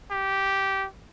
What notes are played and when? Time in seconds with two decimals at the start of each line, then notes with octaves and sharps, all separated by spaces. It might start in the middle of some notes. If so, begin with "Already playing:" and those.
0.11 G4